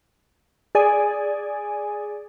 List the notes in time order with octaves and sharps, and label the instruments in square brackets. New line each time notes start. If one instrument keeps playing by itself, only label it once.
[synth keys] G#4 D5 G#5